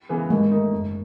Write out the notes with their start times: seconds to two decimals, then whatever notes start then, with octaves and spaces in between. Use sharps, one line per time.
0.09 C#3 E3 G#3 B3
0.30 D#2 G#3
0.51 D#3 A3 D#4
0.72 F#1